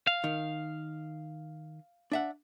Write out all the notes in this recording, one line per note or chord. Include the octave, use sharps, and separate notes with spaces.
F5
D#3
D4 E5 F#5